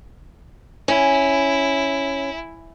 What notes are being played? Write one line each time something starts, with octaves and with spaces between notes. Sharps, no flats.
C#4 E4